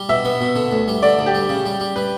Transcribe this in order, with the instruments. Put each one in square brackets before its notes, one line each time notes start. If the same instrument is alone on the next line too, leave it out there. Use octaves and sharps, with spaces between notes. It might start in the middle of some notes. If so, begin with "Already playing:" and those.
Already playing: [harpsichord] G3
[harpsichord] B2 [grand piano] E5
[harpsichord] B3
B2
D3
D2
G3
[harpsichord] D3 [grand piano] D5
[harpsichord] D2
[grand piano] G4
[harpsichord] G3
C#3
G3
G3
[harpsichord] G3 [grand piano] B4